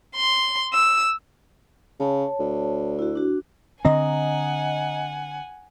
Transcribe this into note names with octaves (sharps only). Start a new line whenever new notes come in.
C6
E6
C#3 C#5 A5
D2
E4 F#4
D4 F#4
D3 C4 D#5 F#5 G#5 A#5